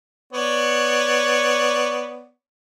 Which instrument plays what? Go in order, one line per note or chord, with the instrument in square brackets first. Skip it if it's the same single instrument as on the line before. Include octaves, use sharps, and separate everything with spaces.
[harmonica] B3 C#5 D5